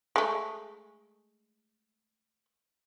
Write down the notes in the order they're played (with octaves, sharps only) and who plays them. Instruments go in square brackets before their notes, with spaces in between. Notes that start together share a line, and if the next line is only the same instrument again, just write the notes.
[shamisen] G#3 A3